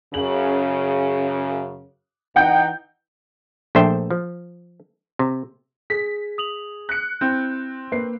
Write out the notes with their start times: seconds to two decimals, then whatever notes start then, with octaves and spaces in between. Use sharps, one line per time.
0.14 F#2 C#3 F#7
2.36 E3 D#4 F#5 G5 G6
3.75 A#1 A3 D4 C5 E5 G5
4.11 F3
5.19 C3
5.90 G#4 B6
6.38 D#6 F7 F#7
6.89 F#6 C#7
7.21 C4 E4 G6
7.92 A#3 B4 C7